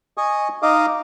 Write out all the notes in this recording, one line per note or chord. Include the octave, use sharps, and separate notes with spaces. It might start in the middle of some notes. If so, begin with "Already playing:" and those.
D#5 G#5 C#6 D#6
D#4 D#5 F5 D6 D#6